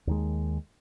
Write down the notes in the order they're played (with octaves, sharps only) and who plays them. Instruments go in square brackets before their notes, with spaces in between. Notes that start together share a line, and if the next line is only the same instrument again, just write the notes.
[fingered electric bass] D#2 D#3 G#3